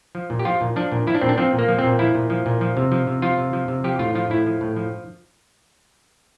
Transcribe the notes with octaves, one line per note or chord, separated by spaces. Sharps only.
F3
A#2
G4
F3 F4
A#2
F3 D4
A#2
F3 E4
D4
A#2 C4
D4
F3 C4
A#2
A#3
F3
C4
A#2
F3 E4
A#2
F3
A#2
F3
C3
F3
C3
F3 F4
C3
F3
C3
F3 G4
A2 F4
F3 F4
A2 E4
F3
A2
F3